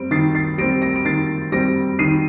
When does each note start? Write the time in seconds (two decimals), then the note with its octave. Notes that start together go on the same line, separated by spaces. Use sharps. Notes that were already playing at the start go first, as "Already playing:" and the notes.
Already playing: G3 C4 D7
0.11 D#3 A6 C7
0.35 A6 C7
0.58 G3 C4 A#6 D7
0.82 A#6 D7
0.96 D7
1.05 D#3 A6 C7
1.52 G3 C4 A#6 D7
1.99 D#3 C7 D#7